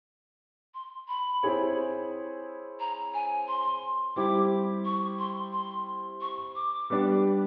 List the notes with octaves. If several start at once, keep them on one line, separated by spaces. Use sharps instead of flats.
C6
B5
C4 E4 G#4 C#5
A#5
G#5
C6
G3 C4 E4 G4 D6
C#6
C6
C6
C#6
D6
G3 B3 D4 G4